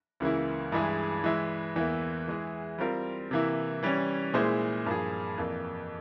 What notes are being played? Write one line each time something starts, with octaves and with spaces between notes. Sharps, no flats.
C#2 C#3 E3 A#3 E4
G2 E3 G#3 E4 G#4
E3 G#3 E4
E2 E3 A#3 E4
E3 G#3 E4 G#4
G3 C4 F4 A#4
C3 E3 A#3 E4
E3 G3 C#4
A#2 G#3 E4 G#4 C5
G2 F3 A#3 F4 G#4
F2 E3 A#3